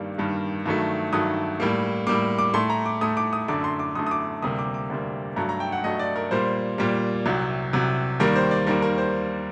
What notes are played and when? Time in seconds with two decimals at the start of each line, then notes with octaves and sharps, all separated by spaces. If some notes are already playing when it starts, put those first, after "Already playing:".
Already playing: G2 D#3 G3 A#3
0.18 G2 D#3 G3 A#3
0.66 G2 D#3 F#3 A3
1.13 G2 D#3 F#3 A3 D#6
1.60 A2 G3 A#3
2.07 A2 G3 A#3 D6
2.38 D6
2.54 A2 A3 C6
2.70 A#5
2.86 D6
3.01 A2 A3 D#6
3.17 D6
3.33 D#6
3.48 F#2 D3 A3 D6
3.64 C6
3.79 D6
3.95 F#2 D3 A3 D#6
4.07 D#6
4.11 D6
4.42 D2 C3 G3 A#3 D#6
4.59 D6
4.74 D6
4.90 D2 C3 G3 A#3
5.36 G2 F#3 A3 A#5
5.49 A#5
5.60 G5
5.72 F#5
5.84 G2 F#3 A3 D#5
5.99 D5
6.16 A#4
6.31 A#2 G3 A#3 C5
6.78 A#2 G3 A#3
7.26 C2 C3 F#3
7.73 C2 C3 F#3
8.20 D#2 D#3 G3 A#3 A#4
8.36 C5
8.51 D5
8.67 D#2 D#3 G3 A#3 A#4
8.82 A#4
8.98 C5